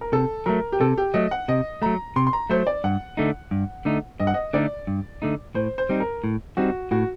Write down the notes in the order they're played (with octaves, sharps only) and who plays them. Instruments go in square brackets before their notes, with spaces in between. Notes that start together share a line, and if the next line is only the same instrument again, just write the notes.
[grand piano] A#4
[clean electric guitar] C3 [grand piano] A4
[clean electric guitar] F#3 A3 [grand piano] A#4
[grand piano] G4
[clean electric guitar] C3 [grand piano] A4
[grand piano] G4
[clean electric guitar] F#3 A3 [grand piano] D#5
[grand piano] F#5
[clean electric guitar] C3 [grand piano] D#5
[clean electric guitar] F#3 A3 [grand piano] A#5
[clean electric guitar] C3 [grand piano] C6
[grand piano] C6
A#5
[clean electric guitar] F#3 A3 [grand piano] C5
[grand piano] D5
[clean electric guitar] G2 [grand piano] F#5
[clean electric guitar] D3 A3 D#4
G2
D3 A3 D#4
[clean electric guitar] G2 [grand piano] D#5
[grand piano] F#5
D#5
[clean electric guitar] D3 A3 D#4 [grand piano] D5
[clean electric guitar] G2
D3 A3 D#4
[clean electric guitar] A2 [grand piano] C5
[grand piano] C5
[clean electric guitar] G3 C4 D#4
[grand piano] A#4
[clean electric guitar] A2
[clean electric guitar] G3 C4 D#4 [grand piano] F#4
[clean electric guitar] A2 [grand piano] F#4